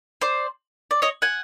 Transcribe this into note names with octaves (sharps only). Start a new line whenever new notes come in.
C5 D5
D5
C#5 D#5
F#5 G#5